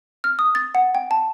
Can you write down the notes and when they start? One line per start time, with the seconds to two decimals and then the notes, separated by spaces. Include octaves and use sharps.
0.24 F6
0.39 D#6
0.55 A6
0.75 F#5
0.95 G5
1.11 A5